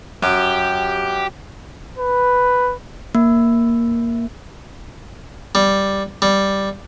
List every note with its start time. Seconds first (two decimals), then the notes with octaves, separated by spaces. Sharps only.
0.23 F#2 G4
1.98 B4
3.15 A#3
5.55 G3
6.22 G3